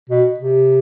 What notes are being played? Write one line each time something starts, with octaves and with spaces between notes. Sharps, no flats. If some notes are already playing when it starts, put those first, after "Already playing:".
B2
C3